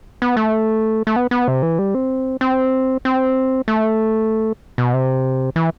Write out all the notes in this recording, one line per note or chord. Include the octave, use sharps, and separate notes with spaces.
B3
A3
A3
B3
B3
C3
E3
G3
C4
C4
C4
A3
B2
C3
E3